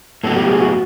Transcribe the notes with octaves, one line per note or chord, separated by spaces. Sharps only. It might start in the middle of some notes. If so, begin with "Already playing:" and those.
A2 F#3 B3 A4
G4
G#4
F#4